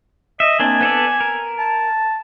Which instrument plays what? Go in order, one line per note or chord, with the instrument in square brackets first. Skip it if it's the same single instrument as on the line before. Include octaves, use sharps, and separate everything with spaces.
[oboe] D#5 [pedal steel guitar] E5
[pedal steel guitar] A#3 C4 D4 [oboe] G#5
[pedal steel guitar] B3 A4 D5
A#4
[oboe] A5